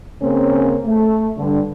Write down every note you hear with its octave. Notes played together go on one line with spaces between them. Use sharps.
C#3 A#3 C4 C#4
A3
G2 D3